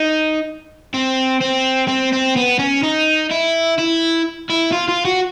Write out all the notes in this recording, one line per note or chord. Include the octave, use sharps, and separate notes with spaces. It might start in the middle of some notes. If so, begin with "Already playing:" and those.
Already playing: D#4
C4
C4
C4
C4
B3
C#4
D#4
E4
E4
E4
F4
F4
F#4